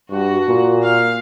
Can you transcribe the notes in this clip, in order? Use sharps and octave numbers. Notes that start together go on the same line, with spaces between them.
G2 F#4
A#2
F5